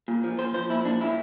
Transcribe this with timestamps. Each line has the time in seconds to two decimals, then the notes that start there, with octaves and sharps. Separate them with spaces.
0.08 A#2
0.23 F3
0.38 A#2 C5
0.54 F3 C5
0.70 A#2 E4
0.85 A#2 D4
1.00 A#2 E4